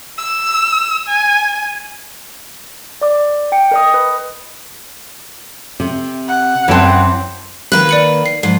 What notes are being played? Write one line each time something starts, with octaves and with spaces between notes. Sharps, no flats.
E6
G#5
D5 D6
G5 C#7
A#4 D#5 D#6
B4
C3
F#5
F#2 E3 C4 G5 A5
D#3 A#3 B4 F#6 F#7
D5 C#7 F#7
C7
G#2 F3 C7